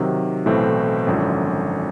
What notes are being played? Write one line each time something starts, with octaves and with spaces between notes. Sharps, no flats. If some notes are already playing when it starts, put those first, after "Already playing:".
Already playing: C3 D#3 F#3
B1 A2 E3 A3 C4
G#1 F#2 D3 F3